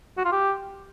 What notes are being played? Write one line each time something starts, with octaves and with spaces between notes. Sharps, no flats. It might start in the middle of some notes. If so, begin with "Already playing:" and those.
F#4
F4
G4